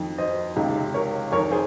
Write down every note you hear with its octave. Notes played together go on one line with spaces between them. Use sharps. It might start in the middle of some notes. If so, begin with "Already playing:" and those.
Already playing: F2 D#3
C5 D#5
C#2 C3 D#3
A#4 C#5
F2 D#3 A#4 C#5
G#4 C5